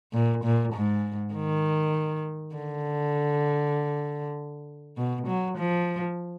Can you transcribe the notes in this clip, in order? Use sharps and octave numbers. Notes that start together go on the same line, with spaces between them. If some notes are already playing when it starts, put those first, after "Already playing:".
A#2
A#2
G#2
D#3
D3
B2
F#3
F3